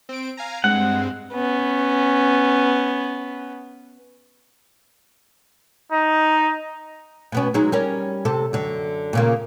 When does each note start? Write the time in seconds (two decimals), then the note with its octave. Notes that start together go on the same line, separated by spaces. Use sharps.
0.09 C4 D7
0.37 F5 G#5 A#5
0.64 G2 G#3 C4 F#5
1.33 B3 C#4
5.92 D#4
7.32 B2 B3 C#4
7.54 F#3 G#3 D#4
7.72 G3 C#4 A#4
8.25 C3 A4
8.53 F#2 D3
9.13 A#2 C#3 A#3